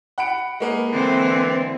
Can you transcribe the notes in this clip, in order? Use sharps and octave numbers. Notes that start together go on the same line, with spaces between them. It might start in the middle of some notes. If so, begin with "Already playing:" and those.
F#5 B5 D7
G#3 A#3 B3
D3 E3 C4